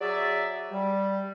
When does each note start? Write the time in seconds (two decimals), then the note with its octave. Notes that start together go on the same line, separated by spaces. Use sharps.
0.01 F#3 G#4 D5 E5
0.71 G3